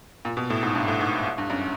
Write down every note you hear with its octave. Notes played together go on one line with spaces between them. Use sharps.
A#2
B2
A2
G#2
G2
A2
G#2
G2
F#2